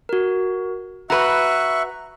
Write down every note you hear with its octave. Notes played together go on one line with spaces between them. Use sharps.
F#4 A#4
F#4 B4 E5 A#5 C#6 F#6